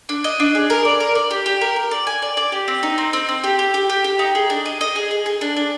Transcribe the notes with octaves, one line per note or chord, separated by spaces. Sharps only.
D4
D#5
D4
G#4
A#4
D5
A#4
D5
G4
G4
A#4
A#4
D5
G#5
D5
D5
G4
C4
D#4
C4
C4
C4
G4
G4
G4
G4
G4
D#4
G#4
D4
D#5
D#5
G#4
G#4
G#4
D4
D4